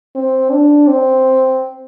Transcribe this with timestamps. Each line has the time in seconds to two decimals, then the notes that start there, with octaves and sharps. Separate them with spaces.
0.15 C4
0.51 D4
0.88 C4